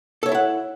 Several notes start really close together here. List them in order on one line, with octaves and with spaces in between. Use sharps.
A4 C#5 E5 E4 F#5